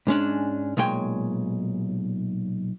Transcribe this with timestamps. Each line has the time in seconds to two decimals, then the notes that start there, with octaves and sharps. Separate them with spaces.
0.07 G#2 G#3 C#4 D4
0.77 B1 A#2 G#3 C#5 G5